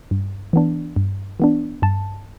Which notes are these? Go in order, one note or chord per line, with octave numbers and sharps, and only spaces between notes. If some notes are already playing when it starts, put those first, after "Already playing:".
G2
E3 B3 D4
G2
E3 B3 D4
G2 A5